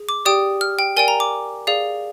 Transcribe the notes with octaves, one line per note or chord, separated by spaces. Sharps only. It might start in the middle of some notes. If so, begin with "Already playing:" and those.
Already playing: G#4
D6
G4 D5 G5 D#6
F6
G5
A#4 D5 G5 G#5
A#5
D6
G#4 D5 F5